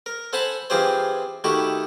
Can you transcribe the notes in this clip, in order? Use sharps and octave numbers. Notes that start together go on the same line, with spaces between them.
A#4
A4 C5 F#5 G#5 A5 B5
E3 C4 F4 G4 G#4 C5
D#3 A3 E4 F#4 G4 A4